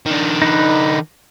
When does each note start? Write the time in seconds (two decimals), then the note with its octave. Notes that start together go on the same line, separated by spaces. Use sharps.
0.06 D#3 D4
0.42 D#4 B4